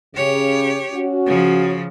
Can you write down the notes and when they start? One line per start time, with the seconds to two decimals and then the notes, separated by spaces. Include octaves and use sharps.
0.15 C#3 G4 C#5
0.92 C#4 F#4
1.26 C#3 F3